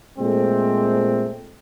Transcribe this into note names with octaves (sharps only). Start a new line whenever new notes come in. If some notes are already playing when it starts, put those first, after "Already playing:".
A#2 G#3 A3 C4